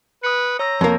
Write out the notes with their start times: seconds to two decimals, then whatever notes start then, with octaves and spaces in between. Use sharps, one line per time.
0.23 B4 D#6 C#7
0.59 C#5 A#5 E6 A#6
0.81 F2 A#3